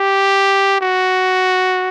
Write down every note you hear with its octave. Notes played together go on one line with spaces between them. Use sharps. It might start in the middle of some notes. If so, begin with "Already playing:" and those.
Already playing: G4
F#4